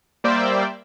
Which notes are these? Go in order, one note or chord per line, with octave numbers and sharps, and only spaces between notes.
G3 A#3 C5 D5 E5 G5